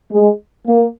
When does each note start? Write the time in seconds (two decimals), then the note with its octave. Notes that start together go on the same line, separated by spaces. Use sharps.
0.12 G#3
0.67 A#3